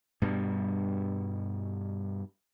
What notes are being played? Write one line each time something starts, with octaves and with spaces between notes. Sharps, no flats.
G2 B2 G3